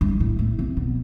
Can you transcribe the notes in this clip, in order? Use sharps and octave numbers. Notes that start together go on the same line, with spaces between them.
G2
A2
A2
C3
B2